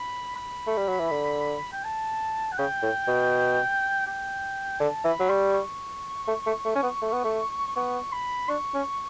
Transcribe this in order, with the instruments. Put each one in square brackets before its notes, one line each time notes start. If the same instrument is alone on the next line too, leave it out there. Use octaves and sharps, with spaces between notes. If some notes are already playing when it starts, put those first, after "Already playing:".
Already playing: [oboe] B5
B5
[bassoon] A3
G3
F#3
E3
D3
[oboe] G5
A5
F#5
[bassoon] C#3 [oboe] G5
[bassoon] A2
B2
[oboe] G5
[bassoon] D3 [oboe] A5
[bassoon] E3 [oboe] B5
[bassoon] F#3
[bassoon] G3 [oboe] C#6
[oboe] C#6
[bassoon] A3
A3
A3
C#4
B3
A3
B3
A3
[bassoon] B3 [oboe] C#6
[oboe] B5
[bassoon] D4 [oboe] C#6
[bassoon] C#4